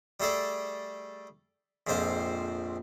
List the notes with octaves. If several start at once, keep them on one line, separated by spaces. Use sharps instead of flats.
G3 A3 G#4 A4 D5
A#1 F2 G#2 C4 F4 C5